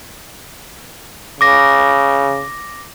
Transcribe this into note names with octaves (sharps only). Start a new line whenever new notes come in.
C#3 D6 A#6